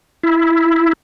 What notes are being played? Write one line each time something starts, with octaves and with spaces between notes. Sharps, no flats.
E4